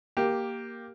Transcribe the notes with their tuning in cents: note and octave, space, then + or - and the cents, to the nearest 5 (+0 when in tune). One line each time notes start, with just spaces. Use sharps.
A#3 +0 G4 +0